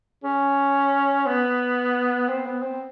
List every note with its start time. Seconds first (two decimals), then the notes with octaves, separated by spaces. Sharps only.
0.24 C#4
1.26 B3
2.29 C4
2.46 B3
2.63 C4